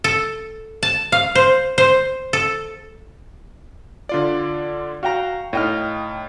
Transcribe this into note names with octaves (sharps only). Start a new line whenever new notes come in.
A4
A5
F5
C5
C5
A4
D3 F4 D5
F#4 F5 G5 A#5
A2 D#4 D#5 G5 F6